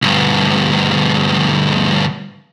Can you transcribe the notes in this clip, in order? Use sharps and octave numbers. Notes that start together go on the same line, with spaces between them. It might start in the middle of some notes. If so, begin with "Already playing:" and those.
D2 G2